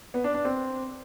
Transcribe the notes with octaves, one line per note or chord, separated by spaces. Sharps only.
B3
D4
D4
C4